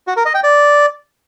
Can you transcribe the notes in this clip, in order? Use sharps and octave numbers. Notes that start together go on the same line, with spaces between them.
F#4
A#4
D#5
G5
D5